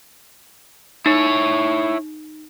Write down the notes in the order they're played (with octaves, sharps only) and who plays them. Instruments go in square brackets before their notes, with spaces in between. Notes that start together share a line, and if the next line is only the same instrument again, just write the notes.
[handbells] D#4 [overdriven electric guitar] E4 C#5